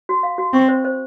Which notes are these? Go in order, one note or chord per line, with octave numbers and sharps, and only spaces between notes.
F#4
F5
F#4
C4 C#6
C5
C5